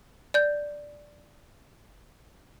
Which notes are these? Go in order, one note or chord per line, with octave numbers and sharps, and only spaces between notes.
D5 G6